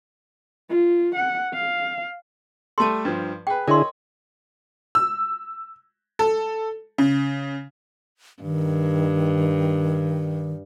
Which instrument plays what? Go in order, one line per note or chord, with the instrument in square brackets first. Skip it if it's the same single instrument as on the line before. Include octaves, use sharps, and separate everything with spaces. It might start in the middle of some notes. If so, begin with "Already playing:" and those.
[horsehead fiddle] F4
F#5
F5
[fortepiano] G3 A3 A4 [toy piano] A5 C6
[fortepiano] G2 F3
[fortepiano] G#4 B4 [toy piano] G5
[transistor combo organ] D3 E4 G#4 [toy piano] A#4 C6 [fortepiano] C#5 D#5
[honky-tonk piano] E6
A4
C#3
[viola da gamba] G2 [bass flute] D#3